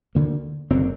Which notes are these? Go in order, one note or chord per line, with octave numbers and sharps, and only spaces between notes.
D2 D3 A#3
F#1 F#2 D3 C4